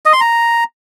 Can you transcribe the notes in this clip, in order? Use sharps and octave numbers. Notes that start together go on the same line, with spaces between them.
D#5
C6
A#5